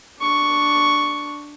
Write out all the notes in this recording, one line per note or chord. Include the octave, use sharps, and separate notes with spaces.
D4 C#6